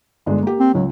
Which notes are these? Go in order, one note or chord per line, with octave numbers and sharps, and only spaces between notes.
G1 G#3 D4
A#3 G4
C4
C#2 F#3